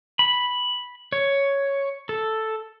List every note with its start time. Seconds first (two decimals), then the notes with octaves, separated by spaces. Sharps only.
0.19 B5
1.12 C#5
2.09 A4